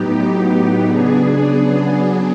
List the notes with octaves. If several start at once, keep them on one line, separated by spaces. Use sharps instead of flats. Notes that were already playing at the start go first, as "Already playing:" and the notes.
Already playing: A2 F#3 B3 D#4 G4
C#3 F#3 B3 D4 G#4